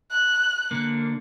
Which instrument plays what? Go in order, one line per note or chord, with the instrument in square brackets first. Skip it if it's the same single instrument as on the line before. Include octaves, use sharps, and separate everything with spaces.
[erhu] F#6
[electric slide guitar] D3 A#3